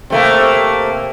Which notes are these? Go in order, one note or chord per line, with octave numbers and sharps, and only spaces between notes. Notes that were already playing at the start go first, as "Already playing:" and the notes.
C3 A3 A#3